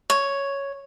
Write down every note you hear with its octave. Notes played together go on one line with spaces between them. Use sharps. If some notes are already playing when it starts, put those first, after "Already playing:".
C#5